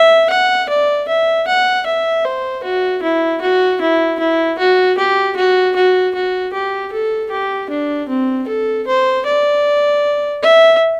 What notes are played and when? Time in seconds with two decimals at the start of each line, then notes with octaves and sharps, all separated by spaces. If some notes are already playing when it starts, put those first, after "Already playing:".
Already playing: E5
0.30 F#5
0.69 D5
1.08 E5
1.48 F#5
1.86 E5
2.25 C5
2.64 F#4
3.03 E4
3.42 F#4
3.81 E4
4.20 E4
4.59 F#4
4.98 G4
5.37 F#4
5.76 F#4
6.15 F#4
6.53 G4
6.92 A4
7.31 G4
7.70 D4
8.09 C4
8.48 A4
8.87 C5
9.26 D5
10.43 E5